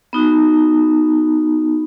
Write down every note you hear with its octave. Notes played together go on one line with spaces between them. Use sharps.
B3 D#4 F#4